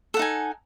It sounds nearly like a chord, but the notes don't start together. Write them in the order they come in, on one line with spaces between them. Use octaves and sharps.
A4 F#5 D#4 G#5